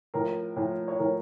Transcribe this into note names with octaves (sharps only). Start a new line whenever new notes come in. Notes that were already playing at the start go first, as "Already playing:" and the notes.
A2 F3 A#4
A2 F3
C#5
A2 F3 A#4